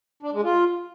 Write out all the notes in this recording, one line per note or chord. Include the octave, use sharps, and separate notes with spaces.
D4
G#3
F4